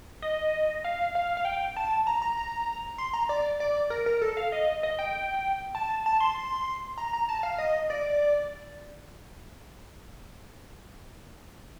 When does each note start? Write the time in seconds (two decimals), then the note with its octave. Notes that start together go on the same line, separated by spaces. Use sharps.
0.22 D#5
0.84 F5
1.15 F5
1.37 F5
1.45 G5
1.77 A5
2.07 A#5
2.22 A#5
2.37 A#5
2.98 C6
3.13 A#5
3.29 D5
3.60 D5
3.90 A#4
4.06 A#4
4.22 A4
4.37 F5
4.52 D#5
4.83 D#5
4.99 G5
5.75 A5
6.06 A5
6.20 C6
6.98 A#5
7.13 A#5
7.29 A5
7.43 F5
7.58 D#5
7.90 D5